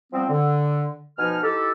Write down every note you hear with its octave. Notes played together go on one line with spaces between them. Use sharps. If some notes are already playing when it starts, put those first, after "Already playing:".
F3 G3 B3 C4
D3
B2 F3 D#4 G#5 F6
D#4 E4 G4 A4